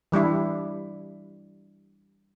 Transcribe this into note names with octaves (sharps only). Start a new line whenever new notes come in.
E3 G3 D4 E4